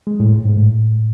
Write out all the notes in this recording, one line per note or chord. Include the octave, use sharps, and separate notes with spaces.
G#3
A2
G#2
G#2
A2